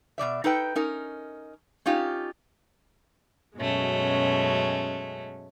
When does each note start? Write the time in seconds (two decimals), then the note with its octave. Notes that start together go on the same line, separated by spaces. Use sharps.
0.18 B2 D#3 D5 E5
0.44 D#4 A4 B4 G5
0.75 C#4 D#4 A#4
1.86 C#4 D#4 F4 G4
3.57 F#2 B2 G#3 A3 C#4